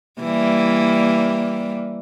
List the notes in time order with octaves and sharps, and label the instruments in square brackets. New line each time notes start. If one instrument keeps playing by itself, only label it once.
[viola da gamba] E3 G3 A#3